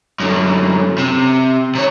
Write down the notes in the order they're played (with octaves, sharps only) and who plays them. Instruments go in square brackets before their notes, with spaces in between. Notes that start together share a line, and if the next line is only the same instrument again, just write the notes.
[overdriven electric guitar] F#2 D3
C3
C3 C#5